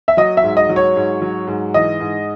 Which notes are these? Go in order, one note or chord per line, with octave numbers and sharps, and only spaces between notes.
E5
F#3 D#5
E5
G#2
D#5
F#3
C#5
G#2
F#3
G#2
E3 D#5
G#2